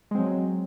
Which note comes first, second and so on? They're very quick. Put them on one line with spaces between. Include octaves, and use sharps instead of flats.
G#3 C4 F#3